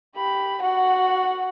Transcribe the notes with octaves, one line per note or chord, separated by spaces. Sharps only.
G4 B5
F#4 F#5